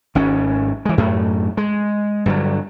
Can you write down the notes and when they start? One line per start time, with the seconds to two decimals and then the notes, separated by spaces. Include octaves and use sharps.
0.15 G#1 G#2 C#4
0.85 E3 G#3
0.98 F#2 A2 A3
1.57 G#3
2.26 G2 D3 F#3